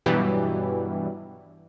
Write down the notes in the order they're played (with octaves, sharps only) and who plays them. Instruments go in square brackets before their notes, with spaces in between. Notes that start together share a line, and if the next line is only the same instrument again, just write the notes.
[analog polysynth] G2 B2 E3 F#3 G3